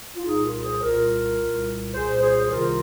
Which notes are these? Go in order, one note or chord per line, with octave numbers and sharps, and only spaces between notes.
F4
C2 A#2 D#4 G#4
F4 A#4
G#4 C5
C2 A#2 F4 A#4
C2 A#2
C2 A#2 G#4 C5
G#4 C5
C5
C2 C3 D#3 F4 A#4